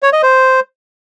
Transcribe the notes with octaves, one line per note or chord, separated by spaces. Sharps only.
C#5
D#5
C5